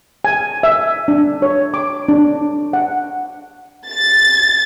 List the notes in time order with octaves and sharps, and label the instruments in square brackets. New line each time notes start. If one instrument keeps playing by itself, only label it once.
[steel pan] G#5
E5
D4
C#5
D6
D4
F#5
[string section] A6